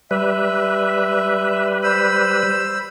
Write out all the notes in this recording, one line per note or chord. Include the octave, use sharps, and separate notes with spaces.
G3 B4 E5
C5 B5 E6